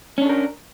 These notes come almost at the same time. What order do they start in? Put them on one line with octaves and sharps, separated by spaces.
C#4 D4 A4 A#4